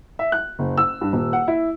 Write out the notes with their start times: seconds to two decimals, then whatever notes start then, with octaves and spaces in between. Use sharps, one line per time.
0.19 E5
0.32 F#6
0.59 F#1
0.78 E6
1.01 G2
1.13 D#1
1.33 F#5
1.48 E4